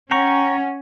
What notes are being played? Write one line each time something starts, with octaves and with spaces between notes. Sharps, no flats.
C#4 F#5 G5 A#5 C#6